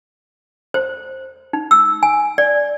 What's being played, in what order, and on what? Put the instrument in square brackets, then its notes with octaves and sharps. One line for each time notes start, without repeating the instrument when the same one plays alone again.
[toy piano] C5
D#4
E6
G#5
D5